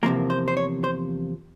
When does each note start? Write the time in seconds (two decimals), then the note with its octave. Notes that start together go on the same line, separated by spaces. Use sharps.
0.03 E2 C3 F3 A#3 A#4
0.30 C5
0.48 C5
0.57 C#5
0.84 C5